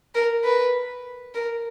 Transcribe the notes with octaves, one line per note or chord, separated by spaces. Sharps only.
A#4
B4
A#4